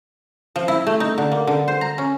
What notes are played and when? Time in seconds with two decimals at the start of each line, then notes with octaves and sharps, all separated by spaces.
0.56 F3
0.68 E4
0.87 A3
1.00 D#4
1.18 D3
1.32 A#3
1.47 D3
1.68 C5
1.81 A#5
1.98 C#4